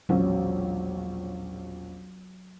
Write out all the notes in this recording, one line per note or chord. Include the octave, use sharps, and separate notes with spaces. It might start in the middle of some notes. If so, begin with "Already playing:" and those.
E1 A#1 F#3 C#4